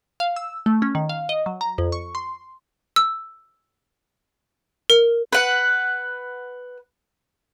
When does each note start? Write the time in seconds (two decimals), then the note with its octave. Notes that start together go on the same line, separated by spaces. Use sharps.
0.20 F5
0.36 E6
0.66 A3
0.82 C#4
0.95 D#3
1.09 F5
1.29 D#5
1.46 F#3
1.61 A#5
1.78 F2
1.92 C#6
2.15 C6
2.96 E6
4.90 A#4
5.33 B4 F#5